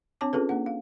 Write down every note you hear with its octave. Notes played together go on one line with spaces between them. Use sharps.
C4 D4 C#5 A5 D6
C#4 F4 G#4 A4 B4
A#3 D4 F#5
F5